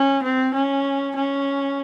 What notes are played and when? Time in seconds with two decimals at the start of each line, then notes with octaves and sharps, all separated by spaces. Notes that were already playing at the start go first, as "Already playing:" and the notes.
Already playing: C#4
0.23 C4
0.54 C#4
1.16 C#4